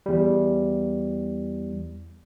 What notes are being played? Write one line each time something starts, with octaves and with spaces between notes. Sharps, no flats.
E2 G3